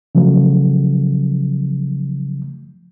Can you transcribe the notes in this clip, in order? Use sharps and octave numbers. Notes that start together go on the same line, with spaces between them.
C#3 F3 F#3 A3